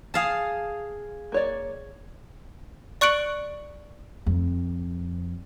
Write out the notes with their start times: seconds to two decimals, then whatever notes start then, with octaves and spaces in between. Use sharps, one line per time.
0.14 G#4 F5 A5
1.32 A#3 C#5 D5
3.01 D5 C#6 F#6 C#7 D7 F#7
4.26 F2